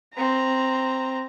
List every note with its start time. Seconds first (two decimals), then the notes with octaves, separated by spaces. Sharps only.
0.14 C4 A#5